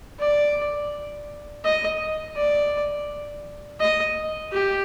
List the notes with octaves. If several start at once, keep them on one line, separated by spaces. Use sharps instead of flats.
D5
D#5
D5
D#5
G4